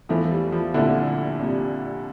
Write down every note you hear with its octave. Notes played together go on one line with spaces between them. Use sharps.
E2 E3 F3 A3 E4
G3
F3
C2 A#2 D3 A3 E4
C2 A#2 G3